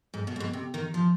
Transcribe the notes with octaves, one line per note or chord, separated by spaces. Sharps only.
G#2
B2
G#2
B2
C3
D#3
F3